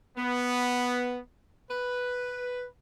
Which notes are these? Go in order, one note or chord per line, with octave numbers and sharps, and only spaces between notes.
B3
B4